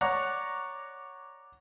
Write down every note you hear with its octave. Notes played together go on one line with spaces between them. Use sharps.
C#5 D5 F#5 A#5